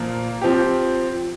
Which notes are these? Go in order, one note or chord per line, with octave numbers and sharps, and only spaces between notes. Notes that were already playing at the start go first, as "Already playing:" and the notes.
Already playing: A#2 F3 A#3
F3 C4 G4